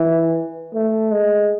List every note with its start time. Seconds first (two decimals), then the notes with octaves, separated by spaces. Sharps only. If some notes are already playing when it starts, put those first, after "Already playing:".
Already playing: E3
0.74 A3
1.12 G#3